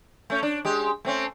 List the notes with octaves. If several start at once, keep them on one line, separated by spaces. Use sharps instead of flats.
A3 C#4
D4
G#3 G4
A3 C4 C#4